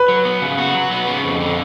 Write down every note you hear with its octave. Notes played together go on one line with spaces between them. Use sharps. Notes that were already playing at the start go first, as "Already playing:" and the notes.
Already playing: B4
F#3
B3
C#3
F#4
F#3
B3
C#3
F2
D3